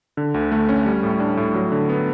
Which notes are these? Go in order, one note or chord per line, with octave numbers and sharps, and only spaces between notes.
D3
D2
A3
C#4
G3
A2
D4
A2
F#3
D3
B3